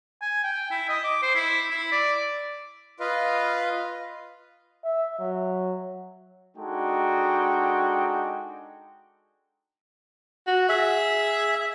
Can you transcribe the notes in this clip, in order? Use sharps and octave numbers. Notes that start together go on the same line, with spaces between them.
G#5
G5
E4
D#5
D6
C5
E4
E4
D5
F4 B4 D#5 F5
E5
F#3
G#3 D4 D#4 F#4 A4 G5
F#4
G#4 E5